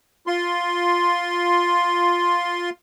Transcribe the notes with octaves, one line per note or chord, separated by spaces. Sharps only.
F4 C6